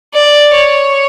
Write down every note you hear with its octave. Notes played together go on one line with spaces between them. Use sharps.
D5
C#5